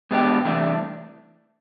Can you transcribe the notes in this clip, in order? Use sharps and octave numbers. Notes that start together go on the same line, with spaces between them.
B2 G#3 B3 D4 G4
C2 C3 E3 A3 D4